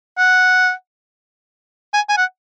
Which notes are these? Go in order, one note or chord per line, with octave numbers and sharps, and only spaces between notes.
F#5
G#5
G#5
F#5